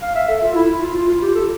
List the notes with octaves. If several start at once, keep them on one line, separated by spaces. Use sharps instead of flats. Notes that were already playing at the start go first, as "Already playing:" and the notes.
F5
E5
A4
F4
E4
F4
F4
F4
G4
A4